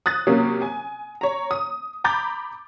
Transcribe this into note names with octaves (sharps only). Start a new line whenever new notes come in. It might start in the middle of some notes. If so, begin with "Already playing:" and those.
D#6 F#6 A6
C3 F#3 A#3 C#4
G#5
C#5 A#5
D#6
A#5 B5 D6 G6 A6